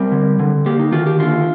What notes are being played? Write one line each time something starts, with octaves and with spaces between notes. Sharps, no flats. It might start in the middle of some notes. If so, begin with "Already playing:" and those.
Already playing: G3 C4 A#4
D3
D3
A#3 G4
D#4
D#3 F4
G4
D3 F4